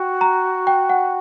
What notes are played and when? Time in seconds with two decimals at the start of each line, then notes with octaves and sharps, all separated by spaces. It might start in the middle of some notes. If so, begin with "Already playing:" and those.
Already playing: F#4 G5
0.21 A#5
0.67 G5
0.89 F#5